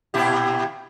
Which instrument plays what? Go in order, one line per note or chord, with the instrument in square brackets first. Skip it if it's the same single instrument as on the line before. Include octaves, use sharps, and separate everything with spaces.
[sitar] A#2 E4 G4